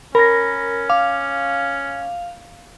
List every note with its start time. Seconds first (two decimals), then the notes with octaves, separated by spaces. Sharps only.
0.15 C#4 A#4 B5 A#6
0.90 F5 D6